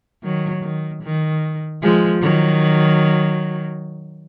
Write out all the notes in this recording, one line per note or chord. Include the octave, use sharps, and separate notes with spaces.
D#3 F#3
D#3
D#3
F3 G#3
D#3 F#3